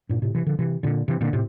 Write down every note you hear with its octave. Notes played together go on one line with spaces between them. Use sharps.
G2 A#2
A2 C3
C3 E3
D3 F3
C3 E3
A#2 D3
C3 E3
A#2 D3
A2 C3